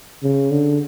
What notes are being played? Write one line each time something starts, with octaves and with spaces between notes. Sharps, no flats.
C#3
D3